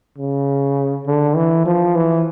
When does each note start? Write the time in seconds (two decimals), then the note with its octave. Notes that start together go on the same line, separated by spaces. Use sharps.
0.18 C#3
1.06 D3
1.36 E3
1.66 F3
1.95 E3